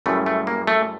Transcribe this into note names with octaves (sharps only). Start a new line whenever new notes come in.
F#2 C#3 E3 G3 A3
A3
A#3
A3